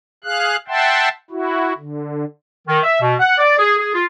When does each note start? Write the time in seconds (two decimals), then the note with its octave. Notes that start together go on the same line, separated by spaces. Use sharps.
0.24 G#4 F5 F#6
0.68 E5 F#5 G5 A5 C6
1.31 E4 F#4
1.77 D3
2.67 D#3
2.83 E5
3.00 B2
3.19 F#5
3.37 D5
3.58 G#4
3.77 G#4
3.93 F4